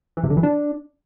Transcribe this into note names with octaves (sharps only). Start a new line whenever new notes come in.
E3
C3
D3
E3
D4